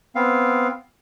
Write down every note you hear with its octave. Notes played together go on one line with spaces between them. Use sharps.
B3 C4 F5